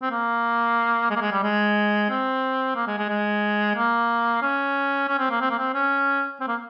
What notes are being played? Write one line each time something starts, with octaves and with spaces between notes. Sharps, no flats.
C4
A#3
G#3
A#3
G#3
G3
G#3
C4
A#3
G#3
G#3
G#3
A#3
C#4
C#4
C4
A#3
C4
A#3
C4
C#4
C4
A#3